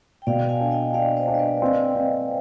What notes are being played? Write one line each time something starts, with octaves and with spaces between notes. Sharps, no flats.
G5
B2 D5 F5
F5 G#5
D4
D#5 G5
D4 D5 F5
C5 D#5
D4
D#5
B4 D5
C4
C4